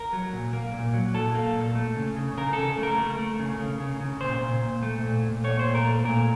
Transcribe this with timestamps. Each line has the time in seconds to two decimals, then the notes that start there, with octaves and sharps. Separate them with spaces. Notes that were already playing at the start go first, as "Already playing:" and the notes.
Already playing: A#4
0.13 F#3
0.33 A#2
0.53 A#3
0.74 A#2
0.94 F#3
1.14 A#2 A4
1.35 A#3
1.56 A#2
1.75 A3
1.96 C#3
2.16 C#3
2.37 C#3 A#4
2.53 A4
2.58 C#3
2.78 A3
2.83 A#4
2.98 A3
3.19 A3
3.39 C#3
3.59 C#3
3.80 C#3
4.01 C#3
4.21 A#2 C5
4.41 A#2
4.62 A#2
4.83 A3
5.03 A#2
5.24 A#2
5.44 A3 C#5
5.59 A#2 C5
5.75 A#4
5.85 A3
6.05 A#2 A#4